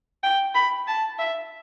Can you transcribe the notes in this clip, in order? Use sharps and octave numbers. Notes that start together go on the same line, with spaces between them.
G5
B5
A5
E5